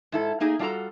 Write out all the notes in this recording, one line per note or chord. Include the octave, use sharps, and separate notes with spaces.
G#2 E4 A4
A3 A#3 D#4 G#4
G3 D4 F4 F#4 A4 A#5